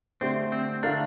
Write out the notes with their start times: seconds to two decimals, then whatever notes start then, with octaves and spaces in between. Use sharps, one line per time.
0.21 D3 A3 C4 D4 G4 C5
0.52 C4
0.83 D3 A3 D4 E4 A#4 F5